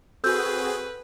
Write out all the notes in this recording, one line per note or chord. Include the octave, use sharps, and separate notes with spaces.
C4 F#4 G#4 A4 B4 E6 G6